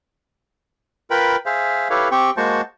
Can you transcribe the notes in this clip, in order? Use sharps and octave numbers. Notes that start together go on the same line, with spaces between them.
F4 A#4 B4 G5 B5
G#4 C5 E5 F5
E4 G4 A4 B4 C#5 F5
C4 G4 G5 C#6
G#3 A#3 F#4 C5 A5 C#6